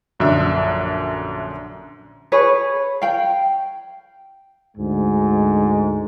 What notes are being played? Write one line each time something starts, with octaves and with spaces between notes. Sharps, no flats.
A#1 F#2 D3 D4 E5
G#4 B4 C#5
F5 G5
D2 G#2 G#3